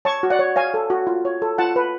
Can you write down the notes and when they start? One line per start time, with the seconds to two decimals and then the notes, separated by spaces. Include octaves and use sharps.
0.05 C#5 A5 C#6
0.23 F#4
0.30 D5 F#5
0.39 C#5
0.56 C#5 F5 G#5
0.74 A4
0.90 F#4
1.07 F4
1.25 C#5
1.42 A4
1.58 F4 F#5 A5
1.76 B4